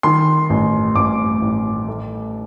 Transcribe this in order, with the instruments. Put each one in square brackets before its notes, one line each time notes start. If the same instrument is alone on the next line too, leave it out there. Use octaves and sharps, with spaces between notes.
[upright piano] D#3 C6
A1
A1 D6
A1
A3